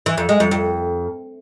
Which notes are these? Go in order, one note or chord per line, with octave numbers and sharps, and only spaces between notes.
E3
F2
G#3
F2
F2